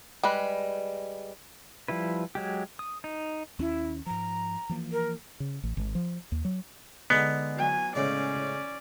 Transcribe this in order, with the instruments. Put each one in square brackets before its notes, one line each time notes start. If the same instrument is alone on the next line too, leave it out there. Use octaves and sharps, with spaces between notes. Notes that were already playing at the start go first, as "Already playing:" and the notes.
[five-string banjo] G3 G#3 B4
[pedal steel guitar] F3 G3 E4 B4
F#3 G#3 G4
D#6
D#4
[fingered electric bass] D#2 C#4 [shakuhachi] E4
[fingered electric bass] G#2 F3 [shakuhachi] A#5
[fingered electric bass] E3 F3 A#3
[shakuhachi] A#4
[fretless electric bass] C#3
A1
G#1
F3
D#2
F#3
[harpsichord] D3 G#3 D#4 [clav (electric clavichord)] B3
[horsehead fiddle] F#3 G#5
[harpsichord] A2 C#3 G#3 [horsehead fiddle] C#4 D5